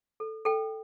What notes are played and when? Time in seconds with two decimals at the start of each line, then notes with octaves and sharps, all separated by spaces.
0.20 A4
0.45 A4 G5